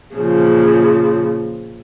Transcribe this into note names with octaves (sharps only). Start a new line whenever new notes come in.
A#2 C#3 F3